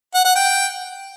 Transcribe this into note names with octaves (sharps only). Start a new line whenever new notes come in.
F#5
F#5
G5